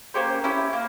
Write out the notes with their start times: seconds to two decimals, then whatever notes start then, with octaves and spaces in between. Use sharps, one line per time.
0.14 A#3 C#4 G4 C5
0.44 C#4 E4 G4
0.73 A#3